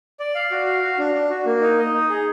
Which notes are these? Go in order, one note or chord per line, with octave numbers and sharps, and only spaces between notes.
D5
F5
F#4
F5
F#4
D4
D4
F#4
A#3
D#4
D#5
D#4
G#4